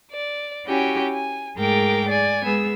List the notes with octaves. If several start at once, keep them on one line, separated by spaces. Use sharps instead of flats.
D5
C#4 E4 F#4 G4 G5 G#5
G#5
G#2 A3 G#4 A#4 G5 D6
D5 G#5
G#3 B3 G#4 E6